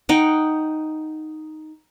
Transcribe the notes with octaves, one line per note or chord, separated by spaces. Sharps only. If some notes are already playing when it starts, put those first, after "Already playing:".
D#4 D#5 F#5 G5